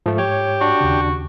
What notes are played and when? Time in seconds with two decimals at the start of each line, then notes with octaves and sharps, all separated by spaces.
0.06 G#2 F3 A3
0.18 G4 C#5
0.61 D4 F#4
0.81 D#2 C#3